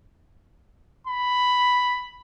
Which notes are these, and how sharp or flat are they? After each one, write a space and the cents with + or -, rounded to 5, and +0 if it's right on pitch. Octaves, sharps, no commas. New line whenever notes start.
B5 +5